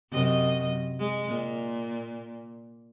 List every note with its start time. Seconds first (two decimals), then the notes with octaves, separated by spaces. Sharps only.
0.11 F#2 C3 D#5
0.99 G#3
1.27 A#2